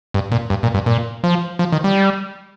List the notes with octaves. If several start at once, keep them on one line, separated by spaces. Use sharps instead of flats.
G2
A#2
G2
A#2
G2
A#2
F3
F3
D#3
G3